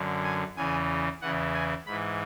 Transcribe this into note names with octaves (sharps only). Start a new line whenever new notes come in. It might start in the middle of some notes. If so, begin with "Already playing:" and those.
Already playing: F#2 D3
G#5
E2 C#3 E3 G#5
E2 C#3 E3 F#5
G#5
G#2 E3 B5